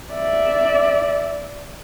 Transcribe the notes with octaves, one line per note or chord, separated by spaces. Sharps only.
D5 E5